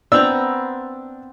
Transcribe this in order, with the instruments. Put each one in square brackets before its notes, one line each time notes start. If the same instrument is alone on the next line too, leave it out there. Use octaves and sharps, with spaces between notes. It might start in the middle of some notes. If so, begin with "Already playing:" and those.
[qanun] B3 C4 A#5 [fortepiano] D4 E6